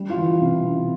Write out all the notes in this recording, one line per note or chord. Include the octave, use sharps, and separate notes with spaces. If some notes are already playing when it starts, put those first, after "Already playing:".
Already playing: G3
F4
E3
C3
C3